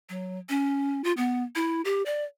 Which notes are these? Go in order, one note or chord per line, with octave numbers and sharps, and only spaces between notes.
F#3
C#4
F4
B3
E4
G4
D5